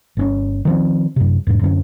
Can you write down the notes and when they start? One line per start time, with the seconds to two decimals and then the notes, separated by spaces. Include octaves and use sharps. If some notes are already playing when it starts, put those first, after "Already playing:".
0.17 G1 C4 C#4
0.65 D#3 F3 C4
1.16 F#2 C3
1.47 E2 G#2
1.61 F#2 D3 B3 C#4